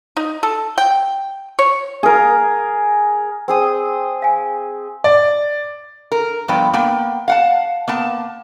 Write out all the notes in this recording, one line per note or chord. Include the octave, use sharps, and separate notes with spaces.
D#4
A4
G5
C#5
G#4 A#4
C4 G#4 D#6
F5 G#5
D5
A#4
G2 F3 B3 G5
A#3 B3 G5
F5 F#5 A5
A#3 B3 A5